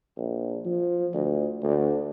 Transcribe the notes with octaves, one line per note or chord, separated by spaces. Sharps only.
A#1
F3
D2
D2